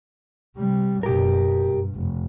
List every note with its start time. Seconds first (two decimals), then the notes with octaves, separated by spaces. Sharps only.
0.57 C3 G3
1.03 F#1 B2 G4 A#4
1.65 G2
1.95 F1